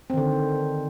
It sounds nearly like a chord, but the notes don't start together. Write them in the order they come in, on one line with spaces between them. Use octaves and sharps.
C4 D#3 D3